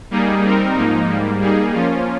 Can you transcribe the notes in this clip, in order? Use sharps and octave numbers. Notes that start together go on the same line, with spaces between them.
G3 A#3 D#4 G#4
G3 C4 D#4 A#4
G#2 F3 A#3 D#4
G#2 G3 A#3
G3 A#3 D#4 G#4
F3 A#3 C#4 F4